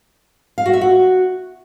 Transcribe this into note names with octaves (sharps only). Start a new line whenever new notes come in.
F5
F#4
E5
F#4